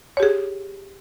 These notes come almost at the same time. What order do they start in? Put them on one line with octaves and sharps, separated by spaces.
C#5 G4 G#4